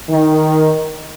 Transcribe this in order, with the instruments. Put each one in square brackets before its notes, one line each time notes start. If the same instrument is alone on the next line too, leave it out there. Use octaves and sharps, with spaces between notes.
[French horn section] D#3